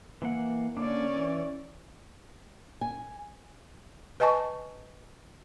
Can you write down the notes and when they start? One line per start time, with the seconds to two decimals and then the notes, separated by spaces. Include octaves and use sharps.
0.22 E3 A#3 F#5
0.77 D3 A#3 C#4 D4 D5
1.16 E3
2.81 G#5
4.20 B4 D#5 G#5 A5 C#6